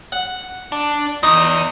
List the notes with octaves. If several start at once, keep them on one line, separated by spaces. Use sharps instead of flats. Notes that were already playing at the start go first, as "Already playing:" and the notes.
F#5
D4
E2 D#4